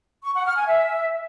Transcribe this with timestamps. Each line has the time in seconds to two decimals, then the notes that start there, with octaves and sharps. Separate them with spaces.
0.24 C#6
0.35 F#5
0.45 F6
0.56 G#5
0.67 E5